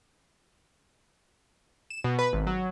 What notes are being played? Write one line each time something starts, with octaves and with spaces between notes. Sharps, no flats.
E7
B2
B4
G#1
F#3